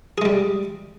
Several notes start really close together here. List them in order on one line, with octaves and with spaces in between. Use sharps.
G#4 G#3 G3